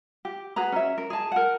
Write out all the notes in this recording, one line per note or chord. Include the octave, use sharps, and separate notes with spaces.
G4
F#4 G#4 B4 A#5
C#4 E5
A#4
G#4 A5
A#4 F#5